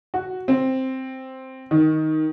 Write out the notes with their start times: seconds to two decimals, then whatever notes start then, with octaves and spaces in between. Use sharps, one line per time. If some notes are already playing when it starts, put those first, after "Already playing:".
0.14 F#4
0.48 C4
1.71 D#3